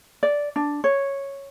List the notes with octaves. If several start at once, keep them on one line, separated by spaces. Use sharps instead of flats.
D5
D4
C#5